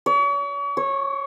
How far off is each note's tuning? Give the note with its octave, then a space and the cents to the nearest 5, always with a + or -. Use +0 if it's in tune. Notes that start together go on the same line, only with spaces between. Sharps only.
C#5 +40
C#5 -15